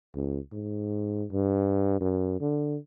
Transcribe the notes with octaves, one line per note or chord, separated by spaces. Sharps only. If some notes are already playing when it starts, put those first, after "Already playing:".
C#2
G#2
G2
F#2
D3